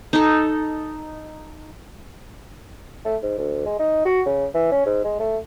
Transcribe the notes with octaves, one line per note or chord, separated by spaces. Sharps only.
D#4 A4
A3
G#2
D2
G#3
D#4
F#4
C#3
E3
C#4
G#2
G#3
A3